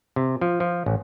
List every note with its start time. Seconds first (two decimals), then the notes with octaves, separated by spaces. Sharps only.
0.16 C3
0.41 F3
0.60 F3
0.86 A1